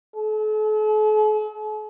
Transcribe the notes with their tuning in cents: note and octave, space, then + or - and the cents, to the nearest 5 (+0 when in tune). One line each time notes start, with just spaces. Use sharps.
A4 -45